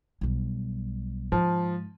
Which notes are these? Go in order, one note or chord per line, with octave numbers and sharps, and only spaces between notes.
B1 G3
G#2 F3